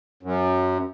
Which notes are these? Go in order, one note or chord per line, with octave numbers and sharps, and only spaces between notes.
F#2